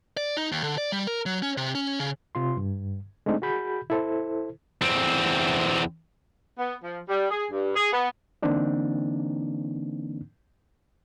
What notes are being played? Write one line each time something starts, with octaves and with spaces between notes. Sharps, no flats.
D5
D#4
D#2
D3
D5
G3
A#4
F#3
C#4
C3
C#4
C#3
C3 F4 C6
G2
G#3 A3 C4 D4 D#4
F#4 G#4 B5 G6
E4 A4 C5
E2 C4
B3
F3
G3
G#4
G2
G#4
B3
D3 E3 A#3 C4 D4 D#4